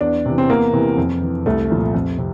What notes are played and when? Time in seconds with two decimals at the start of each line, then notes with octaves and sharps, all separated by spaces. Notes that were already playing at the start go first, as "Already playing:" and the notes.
0.01 E2 D4
0.25 C3 E3
0.38 C4
0.50 E2 A#3
0.73 C3 E3
0.98 F2
1.22 E3
1.46 C2 A3
1.70 A#2 F3
1.94 F2
2.18 C3